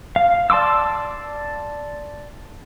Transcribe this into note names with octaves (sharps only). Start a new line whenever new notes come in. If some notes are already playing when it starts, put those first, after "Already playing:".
F5
D5 A5 C6 D6 E6